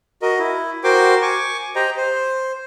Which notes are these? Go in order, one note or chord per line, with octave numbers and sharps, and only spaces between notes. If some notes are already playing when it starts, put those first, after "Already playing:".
F#4 A#4 D#5
E4
F#4 A#4 C5 G5 C6 D6
G#5 C#6 D6
G4 C5 D#5 G5 A#5
C5